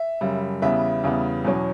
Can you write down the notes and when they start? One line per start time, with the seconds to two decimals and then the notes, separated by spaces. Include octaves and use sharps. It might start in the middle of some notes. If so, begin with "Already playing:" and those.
Already playing: E5
0.21 F#2 C#3 G3
0.62 E2 C#3 G3 B3 E5
1.04 E2 C#3 G3 B3
1.45 E2 B2 F#3 C#4